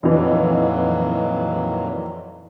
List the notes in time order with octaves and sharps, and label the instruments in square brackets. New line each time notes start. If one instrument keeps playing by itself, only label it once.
[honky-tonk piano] F2 E3 [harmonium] A#2 D#3 F#3